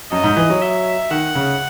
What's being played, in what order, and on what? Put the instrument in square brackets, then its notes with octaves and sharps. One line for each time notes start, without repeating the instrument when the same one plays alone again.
[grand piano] F#2 [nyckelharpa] D#5
[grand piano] G#2
E3
F#3
[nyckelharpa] E5
[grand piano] D#3 [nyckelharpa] F#5
[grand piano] C#3